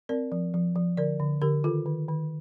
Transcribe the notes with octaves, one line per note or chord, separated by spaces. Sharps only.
C4 A#4 D5
F3
F3
F3
D3 A#4 D5
D3
D3 G4 A#4
D#3 F4 A4
D#3
D#3